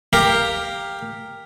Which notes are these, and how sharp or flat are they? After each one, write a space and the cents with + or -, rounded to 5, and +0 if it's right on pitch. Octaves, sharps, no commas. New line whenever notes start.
G4 +15 A#4 +0 F5 +0